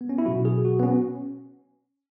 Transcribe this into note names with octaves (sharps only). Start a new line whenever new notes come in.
B3
C#4
E4
B2 F#3 F#4
G#4
F#4
B3
C#4